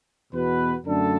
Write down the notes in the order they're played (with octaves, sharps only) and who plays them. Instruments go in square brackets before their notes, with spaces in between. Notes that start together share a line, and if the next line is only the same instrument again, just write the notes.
[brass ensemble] E2 B2 B3 F#4 B4
F#2 D3 A3 D4 A4